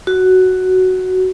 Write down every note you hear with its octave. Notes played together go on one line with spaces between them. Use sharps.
F#4